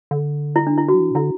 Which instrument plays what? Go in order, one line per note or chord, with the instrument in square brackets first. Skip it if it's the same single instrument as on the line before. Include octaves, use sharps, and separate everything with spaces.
[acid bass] D3
[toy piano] E4
D4
E4
F#4
[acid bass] F#3
E3
B2
[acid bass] D3 [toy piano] E4